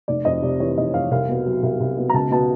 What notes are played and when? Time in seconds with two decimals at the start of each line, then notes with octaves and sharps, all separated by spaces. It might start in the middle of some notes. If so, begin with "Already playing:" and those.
0.08 F1 D5
0.25 F2 D#5
0.42 C3 D5
0.60 E3 C#5
0.78 F1 D#5
0.94 F2 F5
1.11 C2 F5
1.29 B2
1.46 F#3
1.63 C2
1.80 C2
1.97 B2
2.10 A#5
2.14 C#2 A5
2.31 B2 A5